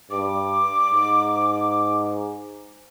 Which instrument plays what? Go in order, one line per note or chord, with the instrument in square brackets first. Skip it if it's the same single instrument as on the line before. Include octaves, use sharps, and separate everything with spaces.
[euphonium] G2 [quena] D6
[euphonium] G#2